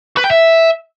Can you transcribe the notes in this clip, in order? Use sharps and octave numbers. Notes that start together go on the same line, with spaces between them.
B4
G5
E5